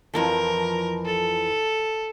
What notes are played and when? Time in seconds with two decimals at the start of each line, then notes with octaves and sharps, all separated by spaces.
0.13 F2 E3 F3 A#4
1.05 A4